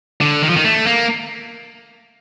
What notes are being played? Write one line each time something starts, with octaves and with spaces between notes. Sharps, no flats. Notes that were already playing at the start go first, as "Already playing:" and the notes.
D3
D#3
F3
D#3
A3
A#3